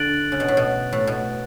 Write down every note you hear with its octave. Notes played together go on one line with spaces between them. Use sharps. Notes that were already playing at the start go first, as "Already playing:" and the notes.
Already playing: D3 F#6 A6 D7 F#7
C#3
B2
A2
B2
A2
B2